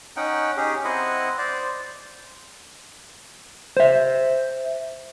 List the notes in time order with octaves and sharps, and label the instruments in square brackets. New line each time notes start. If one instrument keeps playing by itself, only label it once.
[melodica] C#4 D#4 F#5 G5
C#4 D#4 G4 G#4
C4 E4 D#5 F#5
C5 D5
[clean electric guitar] C5 E5